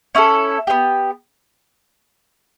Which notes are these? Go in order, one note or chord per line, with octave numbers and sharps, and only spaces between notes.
C#4 E4 A4
B3 D4 G4